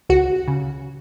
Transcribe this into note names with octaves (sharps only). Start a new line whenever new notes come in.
C#2 F#4
C#3